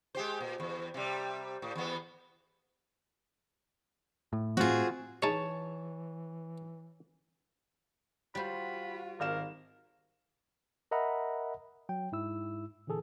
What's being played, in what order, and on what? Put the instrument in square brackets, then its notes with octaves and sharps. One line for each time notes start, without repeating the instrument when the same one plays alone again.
[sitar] G#3 G4 C5
A#2
E2
C3 G3
A2
E2 B3
[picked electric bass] A2
[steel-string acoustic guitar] C4 G#4 [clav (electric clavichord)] F4 F#4
[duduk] E3 [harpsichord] D#4 G#4 [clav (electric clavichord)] C#5 A5
[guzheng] G3 C5 [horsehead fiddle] F4 F#4 [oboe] B5
[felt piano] G#1 F5 E7 [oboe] A#4
[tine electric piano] A#4 D#5 E5 F#5 A#5 B5
F#3 G5
G#2 E4 E6
A#2 D3 E3 G#4 A4